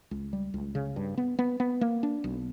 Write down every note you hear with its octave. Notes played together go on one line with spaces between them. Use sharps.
C#2
G3
C#2
C#3
G2
B3
B3
B3
A#3
D4
B1